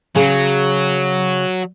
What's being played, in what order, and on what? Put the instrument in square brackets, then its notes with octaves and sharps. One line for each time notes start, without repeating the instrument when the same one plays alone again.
[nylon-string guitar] C#3 G#4 [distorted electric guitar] F#3